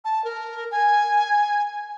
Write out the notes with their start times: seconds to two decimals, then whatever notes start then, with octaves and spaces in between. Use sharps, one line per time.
0.05 A5
0.25 A#4
0.71 G#5